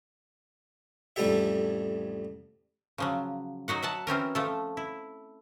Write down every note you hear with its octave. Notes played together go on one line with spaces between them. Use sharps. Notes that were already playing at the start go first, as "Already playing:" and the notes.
A1 F2 G3 A3 G4 E5
C#3 F3 F#3
F#3 D#4 F#4 F#5
E5 F#5 A5
E3 C4 C#4 A#4
F3 A3 A4
E4